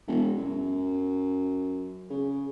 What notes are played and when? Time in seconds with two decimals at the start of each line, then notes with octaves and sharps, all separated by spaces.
0.08 E1
0.37 F#2
2.10 C#3